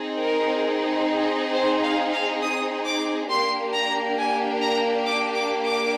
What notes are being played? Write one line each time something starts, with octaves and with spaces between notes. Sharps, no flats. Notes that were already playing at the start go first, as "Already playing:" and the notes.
Already playing: C4 D#4 G#4
A#4
C5
F5
F5
D#6
D6
A#3 D4 G4 C6
A#5
G#5
A#5
D6
D6
D6